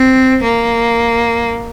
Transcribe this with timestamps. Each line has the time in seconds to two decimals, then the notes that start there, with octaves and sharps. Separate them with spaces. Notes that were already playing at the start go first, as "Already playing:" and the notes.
Already playing: C4
0.43 A#3